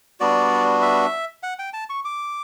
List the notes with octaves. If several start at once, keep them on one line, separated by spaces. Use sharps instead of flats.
G3 B3 D4 F#4 D5
E5
F#5
G5
A5
C#6
D6